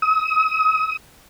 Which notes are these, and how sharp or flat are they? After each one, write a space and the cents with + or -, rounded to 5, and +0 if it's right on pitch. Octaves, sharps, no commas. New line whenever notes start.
D#6 +40